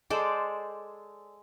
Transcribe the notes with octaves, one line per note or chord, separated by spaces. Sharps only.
G#3 A4 C5 D5